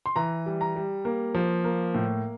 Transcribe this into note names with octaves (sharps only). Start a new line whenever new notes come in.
C6
E3 A#5
G3
A#5
G3
A#3
F3
A#3
A2